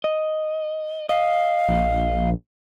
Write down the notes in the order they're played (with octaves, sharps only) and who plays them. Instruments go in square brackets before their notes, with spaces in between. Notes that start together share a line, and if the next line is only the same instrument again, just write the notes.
[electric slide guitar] D#5
[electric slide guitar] D#5 [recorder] F5
[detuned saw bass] A#1